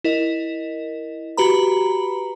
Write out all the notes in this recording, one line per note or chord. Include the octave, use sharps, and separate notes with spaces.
E4 A#4 D#5
F#4 G4 B4 A#5 B5